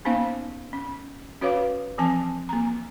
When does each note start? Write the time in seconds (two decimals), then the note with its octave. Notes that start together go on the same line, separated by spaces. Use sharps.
0.05 A#3 B3 C#4 D#4 C5 F5
0.73 C#4
1.41 C#4 F#4 B4 C#5 F5 D6
1.98 E3 F3 C4 G#5 A5
2.49 A#3 A#5